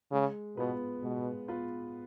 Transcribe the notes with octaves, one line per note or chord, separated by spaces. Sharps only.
C#3 G#3
B2 B3 F4 B4
B2 G#3
B3 F4 B4